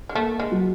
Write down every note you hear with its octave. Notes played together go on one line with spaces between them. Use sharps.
G#3
A3 A#3
G#3
F#3